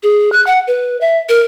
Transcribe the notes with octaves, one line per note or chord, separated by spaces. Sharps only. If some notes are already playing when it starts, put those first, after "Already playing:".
G#4
F#6
F#5
B4
E5
A#4